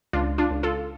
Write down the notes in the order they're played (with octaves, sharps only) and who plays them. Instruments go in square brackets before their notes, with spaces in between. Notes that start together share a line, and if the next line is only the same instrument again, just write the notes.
[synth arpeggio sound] C#2 D4 F4
D4 F4
C#2
F4 A4